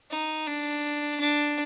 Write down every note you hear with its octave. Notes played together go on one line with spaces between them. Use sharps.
D#4
D4
D4